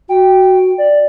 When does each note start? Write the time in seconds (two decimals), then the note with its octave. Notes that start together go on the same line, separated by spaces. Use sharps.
0.09 F#4 G5
0.78 D5